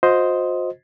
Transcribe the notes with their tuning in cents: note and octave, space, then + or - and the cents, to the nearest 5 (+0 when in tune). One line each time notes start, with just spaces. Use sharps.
F#4 -45 C5 +0 D#5 +10